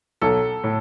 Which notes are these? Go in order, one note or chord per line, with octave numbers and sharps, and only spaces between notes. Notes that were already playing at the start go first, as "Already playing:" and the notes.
B1 A4
A2